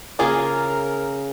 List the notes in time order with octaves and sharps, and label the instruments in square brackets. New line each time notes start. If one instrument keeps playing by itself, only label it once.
[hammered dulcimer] C#3 A#5 [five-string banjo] A#3 F4 G#4 [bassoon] A#4